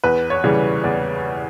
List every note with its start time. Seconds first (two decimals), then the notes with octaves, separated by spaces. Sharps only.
0.04 E2 B4
0.30 C#5
0.44 C#3 E3 G3
0.84 E2 D5